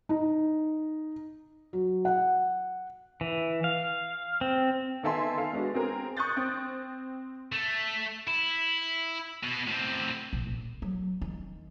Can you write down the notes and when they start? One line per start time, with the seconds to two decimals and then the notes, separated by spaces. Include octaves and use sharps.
0.09 D#4
1.73 F#3
2.05 F#5
3.21 E3
3.64 F5
4.41 C4
5.03 D#3 B3 A4 E5 G#5 C6
5.38 A4 F5
5.53 G#3 B3 D4 F#4
5.75 C4 G#4 A#4
6.17 C#6 D#6 F#6 G6 A6
6.37 C4
7.52 A3
8.28 E4
9.43 B2
9.67 A2 C4
10.33 A#1
10.47 A#1
10.82 F#3
11.21 D#3